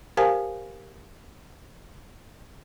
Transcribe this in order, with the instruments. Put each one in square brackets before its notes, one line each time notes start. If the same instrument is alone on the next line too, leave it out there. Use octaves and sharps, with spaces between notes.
[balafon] G4 A#4 C5 F5 G#5 A5